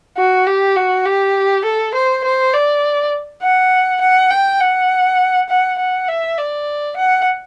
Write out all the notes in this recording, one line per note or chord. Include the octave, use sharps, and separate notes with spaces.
F#4
G4
F#4
G4
A4
C5
C5
D5
F#5
F#5
G5
F#5
F#5
F#5
E5
D5
F#5